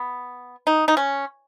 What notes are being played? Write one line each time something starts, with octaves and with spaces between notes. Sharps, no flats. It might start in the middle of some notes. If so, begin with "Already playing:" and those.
Already playing: B3
D#4
D#4
C#4